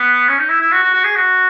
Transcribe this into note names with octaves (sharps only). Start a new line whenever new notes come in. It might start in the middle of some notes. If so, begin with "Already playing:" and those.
Already playing: B3
C#4
D#4
E4
E4
F#4
F#4
F#4
G#4
F#4